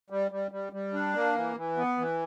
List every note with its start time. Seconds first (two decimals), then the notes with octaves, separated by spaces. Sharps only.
0.10 G3
0.31 G3
0.51 G3
0.73 G3
0.94 D4
1.14 A#3
1.35 E3
1.57 E3
1.77 B3
1.98 E3